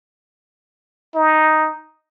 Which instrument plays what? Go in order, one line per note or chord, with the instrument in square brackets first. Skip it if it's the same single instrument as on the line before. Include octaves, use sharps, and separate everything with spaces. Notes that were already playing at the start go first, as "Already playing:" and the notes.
[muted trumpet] D#4